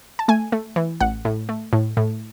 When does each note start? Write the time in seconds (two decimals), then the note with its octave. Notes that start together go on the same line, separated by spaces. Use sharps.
0.19 A5
0.28 A3 G#5
0.52 A3
0.76 E3
1.01 A1 F#5
1.25 A2
1.49 A3
1.73 A2
1.97 A2